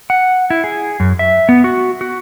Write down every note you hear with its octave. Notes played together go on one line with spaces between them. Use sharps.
F#5
E4
G#4
F#2
E5
B3
F#4
F#4